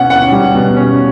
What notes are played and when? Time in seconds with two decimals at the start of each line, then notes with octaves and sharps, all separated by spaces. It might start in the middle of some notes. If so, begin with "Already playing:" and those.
Already playing: B2 C#4 F#5
0.10 C#4 F#5
0.32 G3
0.55 B2
0.77 C#4